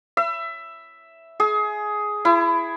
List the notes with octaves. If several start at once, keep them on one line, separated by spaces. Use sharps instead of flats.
E5
G#4
E4